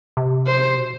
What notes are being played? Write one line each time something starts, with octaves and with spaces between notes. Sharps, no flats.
C3
C5
B2